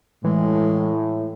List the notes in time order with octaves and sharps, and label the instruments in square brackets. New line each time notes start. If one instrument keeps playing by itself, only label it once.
[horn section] A2 [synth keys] E3 [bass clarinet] G#3